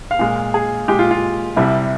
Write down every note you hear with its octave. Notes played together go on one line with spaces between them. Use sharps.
F5
A#2 G#3
G#4
A#2 G#3 G4
F4
F4
C2 C3 G3 E4